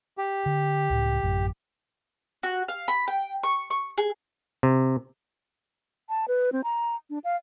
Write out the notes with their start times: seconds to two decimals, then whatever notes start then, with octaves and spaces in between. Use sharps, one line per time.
0.18 G4
0.46 D3
0.90 C#2 A2
1.23 A1 F#2
2.43 F#4
2.68 F5
2.88 B5
3.08 G5
3.44 C#6
3.70 C#6
3.98 G#4
4.63 C3
6.09 A5
6.28 B4
6.52 C4
6.64 A#5
7.10 D4
7.24 F5